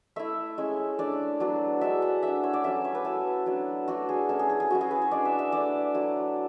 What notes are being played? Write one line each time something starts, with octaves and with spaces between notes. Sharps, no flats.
A3 E4 E5
G#3 C#4 E4
A3 D4 D5
F#3 B3 D4
G#3 D4 E5
F#5
A3 D4 E5
C#5
D5
F#3 A3 C#4 E4 E5
C#5
B4
A3 E4 A4
F#3 B3 D4
A3 D4 F#4
G#4
A3 C#4 E4 A4
G#4
G#4
G#4
F#3 C#4 E4 F#4
G#4
B4
C#5
G#3 D4 D5
E5
E5
A3 D4 D5
F#3 A3 E4